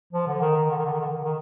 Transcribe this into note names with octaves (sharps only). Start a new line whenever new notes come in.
F3
D3
D#3
D#3
D3
D#3
D3
D#3
D3
D#3
D3
D#3